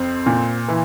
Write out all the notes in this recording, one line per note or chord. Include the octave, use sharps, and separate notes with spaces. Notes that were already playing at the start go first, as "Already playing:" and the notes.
Already playing: F2 C4
A#2
E3